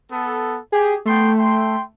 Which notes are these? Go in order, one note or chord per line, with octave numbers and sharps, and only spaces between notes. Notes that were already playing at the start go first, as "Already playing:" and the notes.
B3 A4
G4 G#4
A3 B3 G5 C6
G5 C6